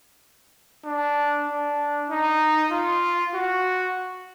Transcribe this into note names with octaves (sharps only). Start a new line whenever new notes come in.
D4
D4
D#4
F4
F#4